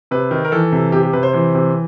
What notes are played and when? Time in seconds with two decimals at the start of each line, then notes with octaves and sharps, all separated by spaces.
0.11 C3 B4
0.31 D#3
0.45 A#4
0.52 E3 A4
0.72 C3
0.92 C3 G4
1.03 G4
1.13 C3 B4
1.23 C5
1.33 E3 C5
1.55 C3